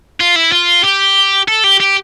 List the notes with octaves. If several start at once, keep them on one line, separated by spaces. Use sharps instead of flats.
F4
E4
F4
G4
A4
G4
G4